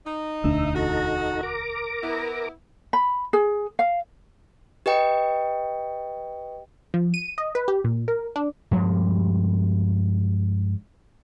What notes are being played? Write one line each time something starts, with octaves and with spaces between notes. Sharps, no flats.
D#4
E1 D2 D4 E5
D#4 F#4 A4 A#5
A#4 A#5 D6
B3 E4
B5
G#4
F5
G4 B4 D#5 G5
F3
D#7
D#5
B4
G4
A#2
A#4
D4
G2 F3 G3 G#3